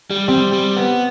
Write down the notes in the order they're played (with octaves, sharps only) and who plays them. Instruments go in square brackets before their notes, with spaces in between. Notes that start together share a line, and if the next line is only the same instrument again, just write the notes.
[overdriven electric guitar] G3
[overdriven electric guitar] G3 [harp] C4
[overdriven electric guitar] G3
B3